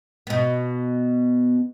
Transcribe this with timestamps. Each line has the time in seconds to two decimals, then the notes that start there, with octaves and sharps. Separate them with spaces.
0.27 B2 B3